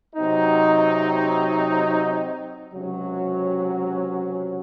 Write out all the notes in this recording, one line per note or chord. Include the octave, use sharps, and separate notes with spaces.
C3 F#3 C4 D#4
C#2 C3 F#3 C#4